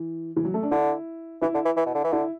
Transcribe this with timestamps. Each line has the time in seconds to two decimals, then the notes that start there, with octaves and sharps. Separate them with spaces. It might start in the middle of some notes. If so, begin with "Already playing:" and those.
Already playing: E3
0.36 E3
0.45 F#3
0.54 A3
0.63 D4
0.71 D3 E4
1.42 E3 E4
1.54 D3
1.65 E3
1.77 E3
1.86 B2
1.95 D3
2.04 E3
2.12 D3 E4